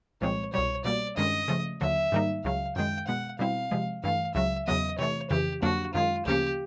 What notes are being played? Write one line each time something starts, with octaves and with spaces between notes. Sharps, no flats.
C2 A#2 F3 G#3 C4 C#5
C2 B2 G3 C#5
B2 G3 A#3 D5
G2 D#3 G#3 C#4 D#5
C#3 F3 A3
D#2 D3 F#3 E5
G#2 D#3 G3 A#3 D#4
C#2 C#3 F#3 F5
F#2 D#3 G#3 G5
B2 G#3 B3 F#5
B2 G3 C4 E4 F5
C3 F3 G#3
G2 E3 A3 F5
C#2 C#3 F#3 E5
E2 C#3 F#3 B3 D#5
C3 E3 A3 C#5
F2 C#3 E3 G4
F2 D3 F#3 A#3 D4 F#4
F#2 D#3 G#3 F4
D2 C#3 F3 A#3 C#4 G4